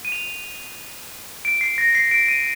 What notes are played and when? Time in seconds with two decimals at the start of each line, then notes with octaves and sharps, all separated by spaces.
0.05 D#7
0.12 F7
1.45 D7
1.61 C7
1.78 A#6
1.95 C7
2.11 D7
2.28 D#7